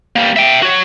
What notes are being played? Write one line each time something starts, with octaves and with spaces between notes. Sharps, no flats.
G3 A#3
E5 G5
F#4 C#5